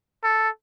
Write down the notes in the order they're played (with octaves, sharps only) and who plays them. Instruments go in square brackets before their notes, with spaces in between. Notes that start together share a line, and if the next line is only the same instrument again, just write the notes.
[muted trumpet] A4